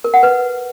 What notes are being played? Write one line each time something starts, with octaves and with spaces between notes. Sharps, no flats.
A#4
F#5
B4